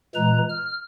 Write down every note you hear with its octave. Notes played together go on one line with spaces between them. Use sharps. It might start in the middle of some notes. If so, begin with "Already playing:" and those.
A#2 E3 G#3 B4 A#5
F6